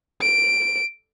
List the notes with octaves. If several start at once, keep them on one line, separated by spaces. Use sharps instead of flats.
D7